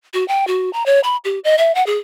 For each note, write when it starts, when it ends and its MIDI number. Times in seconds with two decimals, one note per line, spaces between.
0.14 0.26 66
0.28 0.47 79
0.47 0.72 66
0.73 0.85 82
0.86 1.00 73
1.04 1.17 83
1.25 1.39 67
1.44 1.55 75
1.58 1.74 76
1.75 1.85 78
1.86 1.98 68